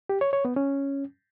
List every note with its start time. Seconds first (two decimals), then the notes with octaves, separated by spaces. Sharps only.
0.09 G4
0.21 C#5
0.33 C#5
0.45 B3
0.56 C#4